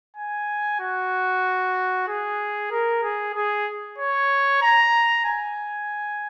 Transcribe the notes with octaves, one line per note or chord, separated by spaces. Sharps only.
G#5
F#4
G#4
A#4
G#4
G#4
C#5
A#5
G#5